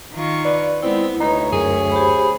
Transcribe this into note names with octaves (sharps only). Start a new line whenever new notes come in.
D#3 F4 C#6
B4 D5
G#3 B3 C4 E4
D2 D#4 B4 C#5 A#5
F#2 G#4 A#4
G4 C5 B5